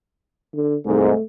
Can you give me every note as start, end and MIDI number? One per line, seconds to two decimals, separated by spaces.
0.55 0.76 50
0.86 1.12 36
0.86 1.12 44
0.86 1.22 57